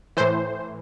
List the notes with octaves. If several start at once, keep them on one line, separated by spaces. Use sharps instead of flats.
A2 E3 C5